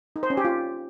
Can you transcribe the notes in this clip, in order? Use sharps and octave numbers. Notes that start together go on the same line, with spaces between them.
D#4
C5
C#4
G4
F4